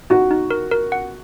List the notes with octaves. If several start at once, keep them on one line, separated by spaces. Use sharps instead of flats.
D#4 F#4
D#4
A#4
A#4
F#5